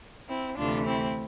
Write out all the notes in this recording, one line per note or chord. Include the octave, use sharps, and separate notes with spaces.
C4 E4
D2 C3 E3 A3 D4 F4
C4 E4